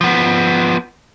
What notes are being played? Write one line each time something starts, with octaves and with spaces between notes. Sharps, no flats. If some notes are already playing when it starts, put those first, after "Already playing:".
F3 B3